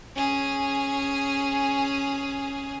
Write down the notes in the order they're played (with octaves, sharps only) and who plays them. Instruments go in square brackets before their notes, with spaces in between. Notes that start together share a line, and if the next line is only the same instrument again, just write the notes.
[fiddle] C#4 G#4